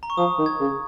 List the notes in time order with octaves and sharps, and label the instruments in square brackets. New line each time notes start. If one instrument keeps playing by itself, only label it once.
[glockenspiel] A#5
C#6
[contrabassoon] F3 [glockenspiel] D#6
[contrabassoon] D#3
[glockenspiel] G#6
[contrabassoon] C#3